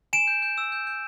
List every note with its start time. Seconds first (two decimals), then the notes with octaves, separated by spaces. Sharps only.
0.13 G#5 D7 E7
0.27 G6
0.42 G6
0.58 E6
0.72 G6
0.87 G6